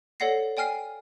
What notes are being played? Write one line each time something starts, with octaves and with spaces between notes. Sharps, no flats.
A4 C#5 D5 F#5 A#6 C7
D5 G5 G#5 F6 C7